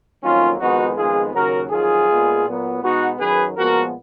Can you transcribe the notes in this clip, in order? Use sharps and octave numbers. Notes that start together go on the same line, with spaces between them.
F2 D#3 F#3 A#3 C#4 F4
F2 D#3 G#3 B3 D#4 F#4
F2 D#3 G#3 B3 F4 G#4
D#2 C#3 F#3 F#4 A#4
F2 D#3 F#3 F4 G#4
A#2 G#3 B3
A#2 F#3 B3
B2 G#3 B3 D#4 F#4
F#2 D#3 F#3 G#4 B4
A#2 F3 G#3 B3 F#4 A#4